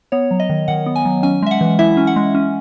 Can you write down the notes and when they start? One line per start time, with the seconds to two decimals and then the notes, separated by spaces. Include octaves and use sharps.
0.12 B3 C#5
0.31 F#3
0.40 D#5
0.49 D#3
0.68 D#3 F#5
0.86 B3
0.96 G#5
1.05 F#3
1.23 C#4 G#5
1.42 G#3 E5
1.51 F#5
1.61 E3
1.79 E4 E5
1.97 C#4
2.07 F#5
2.16 G#3
2.35 C#4